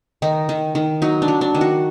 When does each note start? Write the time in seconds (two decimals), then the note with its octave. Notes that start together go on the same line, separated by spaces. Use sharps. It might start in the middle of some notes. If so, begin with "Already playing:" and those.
0.22 D#3 D#4
0.49 D#3
0.75 D#3
1.02 F#3 D#4
1.22 D4
1.28 F#3
1.41 D4
1.55 D#3
1.61 F#4